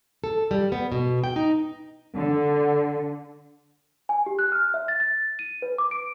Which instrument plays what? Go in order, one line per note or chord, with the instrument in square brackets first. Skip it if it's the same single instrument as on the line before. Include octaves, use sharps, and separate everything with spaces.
[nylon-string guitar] A4
G3
B3
B2
G5
D#4
[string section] D3
[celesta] G#5
G4
F#6
F6
E5
A6
A6
D#7
B4
D6
D7